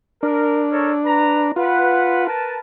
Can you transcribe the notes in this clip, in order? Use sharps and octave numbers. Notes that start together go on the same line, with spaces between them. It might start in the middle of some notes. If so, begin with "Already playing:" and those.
D4 A#4
A4 A#4 C#5
B4 A#5
F4 B4 F#5
A#4 B4 A5